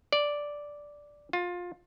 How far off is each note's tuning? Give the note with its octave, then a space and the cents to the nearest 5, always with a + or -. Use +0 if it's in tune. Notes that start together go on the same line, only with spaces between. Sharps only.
D5 -5
F4 +20